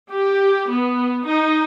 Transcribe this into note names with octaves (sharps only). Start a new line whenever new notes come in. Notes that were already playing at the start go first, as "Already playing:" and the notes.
G4
B3
D#4